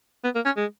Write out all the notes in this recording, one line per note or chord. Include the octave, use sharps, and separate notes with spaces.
B3
A#3
C#4
G#3